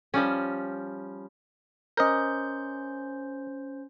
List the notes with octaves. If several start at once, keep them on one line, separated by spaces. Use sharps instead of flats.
F3 G3 C#4
C#4 A#4 C5 D#5 G6